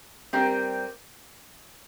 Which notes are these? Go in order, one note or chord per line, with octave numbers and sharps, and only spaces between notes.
G3 C4 G4 A#4